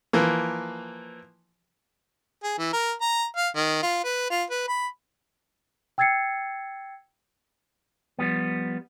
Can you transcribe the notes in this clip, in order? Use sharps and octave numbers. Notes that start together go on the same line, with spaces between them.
E3 F3 A#3
G#4
E3
A#4
A#5
F5
D#3
F4
B4
F4
B4
B5
G5 E6 G#6 A6 C7 C#7
F3 G3 B3